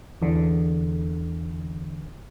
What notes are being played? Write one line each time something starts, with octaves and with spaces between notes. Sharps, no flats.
E2 D3